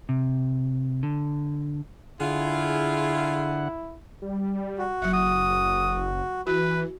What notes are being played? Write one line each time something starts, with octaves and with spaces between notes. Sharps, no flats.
C3
D3
D3 E4 F4 G#4 F#5
G3
F#4
F#1 F#3 E5 F#5
D#6
E3 F#4 B4